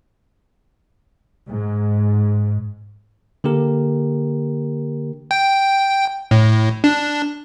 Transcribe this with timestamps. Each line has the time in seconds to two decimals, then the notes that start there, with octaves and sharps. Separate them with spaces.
1.49 G#2
3.44 D3 A#3 G4 A#4
5.31 G5
6.31 A2
6.84 D4